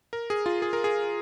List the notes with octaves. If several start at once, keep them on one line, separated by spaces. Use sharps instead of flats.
A#4
G#4
F4
G#4
A#4
G#4